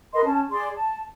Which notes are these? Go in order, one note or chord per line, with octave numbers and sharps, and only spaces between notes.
A#4 B4 D#5 C6
C#4 A5
G#4 D5 C6
A5